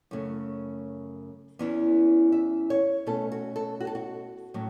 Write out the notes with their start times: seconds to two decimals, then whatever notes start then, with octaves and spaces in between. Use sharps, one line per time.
0.11 F#2 C#3 A3 C#4
1.59 E2 E3 C#4 E4
2.32 E5
2.70 C#5
3.06 B2 A3 C#4 A4
3.32 F#4
3.56 A4
3.80 F#4
3.87 A4
3.95 F#4
4.54 A2 F#3 C#4